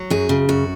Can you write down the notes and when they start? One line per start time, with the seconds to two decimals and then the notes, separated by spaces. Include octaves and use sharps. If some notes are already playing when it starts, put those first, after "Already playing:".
Already playing: F#3
0.10 F#2 G#4
0.29 C#3
0.49 F#2 F#4